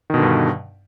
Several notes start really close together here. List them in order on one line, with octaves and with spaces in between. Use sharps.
D#3 B2 D3 G2